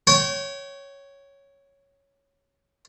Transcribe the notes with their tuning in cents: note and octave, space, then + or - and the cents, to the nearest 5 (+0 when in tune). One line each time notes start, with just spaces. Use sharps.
C#5 +0 G5 -35